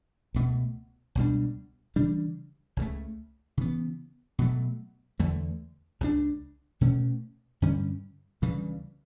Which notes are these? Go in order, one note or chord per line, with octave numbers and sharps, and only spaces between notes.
C#2 B2 A3
C#2 B2 G3 D4
C#3 E3 G3 D4
C#2 C#3 E3 A3
C#3 E3 B3
B2 F#3 A3
E2 D3 A3
C#2 C#3 G3 D4
B2 A3 C#4
G2 D3 G3 C#4
D2 C#3 E3 G3